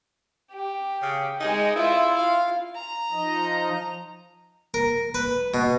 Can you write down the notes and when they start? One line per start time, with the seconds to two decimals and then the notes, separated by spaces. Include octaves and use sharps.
0.52 G4
1.02 C#3
1.40 G#3 D#4 G#4
1.76 E4 F4 E5
2.15 F4 F5
2.75 A#5
3.12 F3 D#4 D#5
4.74 A#4
5.15 B4
5.54 B2